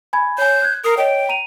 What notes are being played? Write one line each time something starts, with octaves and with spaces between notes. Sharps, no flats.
G#5 B5 G#6
C#5 G#5 G6
F#6 G#6
A#4 D#6 C7
C#5 D#5 G5
A#5 D#7 F7